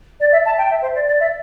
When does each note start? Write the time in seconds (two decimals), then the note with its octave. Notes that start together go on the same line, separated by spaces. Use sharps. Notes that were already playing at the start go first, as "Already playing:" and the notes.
0.20 D5
0.32 E5
0.45 A5
0.57 G5
0.70 E5
0.81 C5
0.95 D5
1.06 D5
1.20 E5